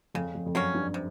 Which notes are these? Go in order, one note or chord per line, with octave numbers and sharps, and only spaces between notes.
F2 C#3
F2
F2
F#2 F#3 A#3 C#4
G2
C3